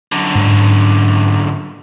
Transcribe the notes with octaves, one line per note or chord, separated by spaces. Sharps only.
F#2 D3
G#2